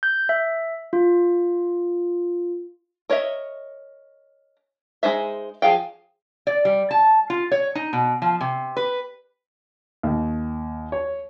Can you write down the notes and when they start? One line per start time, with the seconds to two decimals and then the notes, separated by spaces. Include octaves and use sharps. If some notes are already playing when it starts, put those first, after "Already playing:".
0.03 G6
0.29 E5
0.93 F4
3.10 A#4 C#5 D#5 E5
5.03 G#3 D#4 C5 E5
5.62 F3 G#4 F5 G5
6.47 D5
6.65 G3
6.91 A5
7.30 F4
7.52 C#5
7.75 D#4
7.93 B2
8.22 F3
8.41 C3
8.77 B4
10.03 D#2
10.92 C#5